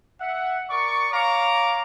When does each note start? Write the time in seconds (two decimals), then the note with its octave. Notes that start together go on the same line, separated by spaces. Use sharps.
0.21 E5 F#5
0.70 A#4 D5 C#6
1.12 C#5 F5 A#5 D6